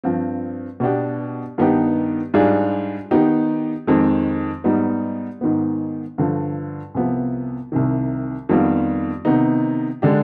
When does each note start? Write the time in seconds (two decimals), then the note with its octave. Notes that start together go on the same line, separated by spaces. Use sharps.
0.04 G2 F3 C4
0.80 B2 B3 D4 G4
1.58 G2 D#3 B3 D#4 G4
2.34 G#2 G3 D4 F4 G#4
3.11 D#3 B3 D#4 G4
3.87 F2 D#3 G#3 C4
4.64 G#2 G3 B3 D#4
5.41 G#2 D#3 B3
6.18 G2 D3 F3
6.94 C2 C3 F3 B3
7.72 C2 C3 D#3
8.49 F2 D#3 G3 B3 F4
9.25 C3 D#3 B3 D#4
10.02 D3 G#3 D4 G4